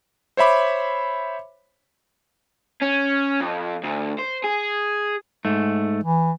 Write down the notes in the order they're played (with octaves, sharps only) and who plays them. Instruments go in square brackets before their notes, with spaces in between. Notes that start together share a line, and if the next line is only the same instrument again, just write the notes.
[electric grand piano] C5 C#5 E5 B5 D6
[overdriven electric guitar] C#4
F2
D2
C5
G#4
[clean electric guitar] G#2 A3
[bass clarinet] E3